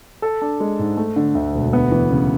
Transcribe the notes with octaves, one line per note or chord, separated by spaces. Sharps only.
A4
D4
G#3
G#2
A3
D3
D2
E1
B3
E3
C#3